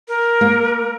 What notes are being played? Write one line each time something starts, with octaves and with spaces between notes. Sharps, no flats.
A#4
A#3